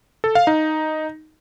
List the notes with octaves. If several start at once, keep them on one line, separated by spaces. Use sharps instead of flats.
A4
F5
D#4